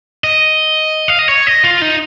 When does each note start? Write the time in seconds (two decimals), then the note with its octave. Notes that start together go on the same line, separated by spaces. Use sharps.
0.24 D#5
1.08 F5
1.19 D#5
1.28 C#5
1.47 D#5
1.64 F4
1.82 D#4